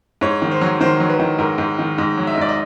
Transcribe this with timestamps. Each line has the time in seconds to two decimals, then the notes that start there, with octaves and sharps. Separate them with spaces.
0.21 G#2 C#5
0.42 D#3
0.51 C5
0.61 F#3
0.81 D#3 C5
1.00 F#3
1.10 B4
1.20 D#3
1.39 G#2 A#4
1.58 G#2
1.79 D#3
1.98 G#2 D#5
2.17 F#3
2.27 E5
2.34 D#5
2.37 G#2 D5
2.49 D#5